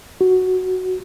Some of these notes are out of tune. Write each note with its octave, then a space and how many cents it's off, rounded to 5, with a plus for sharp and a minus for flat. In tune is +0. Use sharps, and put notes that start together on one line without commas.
F#4 +0